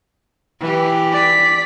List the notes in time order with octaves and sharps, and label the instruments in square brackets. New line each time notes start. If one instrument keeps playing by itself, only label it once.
[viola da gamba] E3 G4
[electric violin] D5 B6